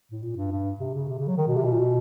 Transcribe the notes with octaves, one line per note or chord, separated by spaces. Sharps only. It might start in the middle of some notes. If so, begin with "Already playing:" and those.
A2
A#2
G2
G2
C3
C#3
C3
C#3
F#3
D#3
B2
C3
B2
A#2
B2